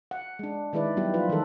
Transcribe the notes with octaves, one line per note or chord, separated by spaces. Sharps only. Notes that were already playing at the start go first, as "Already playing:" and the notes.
F#5
G#3 D4
D#3 G#3 E4 B4 D5
F#3 G3 B3 D#4 E4 G4
F3 F4 B4
D#3 E3 G#3 D#4 A4 A#4